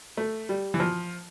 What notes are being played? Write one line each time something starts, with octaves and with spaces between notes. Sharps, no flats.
A3
G3
E3
F3